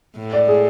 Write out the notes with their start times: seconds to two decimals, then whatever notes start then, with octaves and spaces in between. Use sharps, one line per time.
0.17 A2
0.33 D5
0.48 G#4